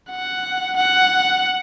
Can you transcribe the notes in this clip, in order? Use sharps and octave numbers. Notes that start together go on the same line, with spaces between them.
F#5
F#5